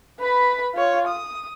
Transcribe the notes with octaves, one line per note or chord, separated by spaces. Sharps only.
B4 B5
F4 C#5
D#6